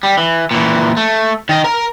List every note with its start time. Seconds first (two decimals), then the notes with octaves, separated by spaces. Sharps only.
0.03 G3
0.17 E3
0.51 A#2 E3
0.97 A3
1.49 D#3 D#5
1.64 A#4 A#5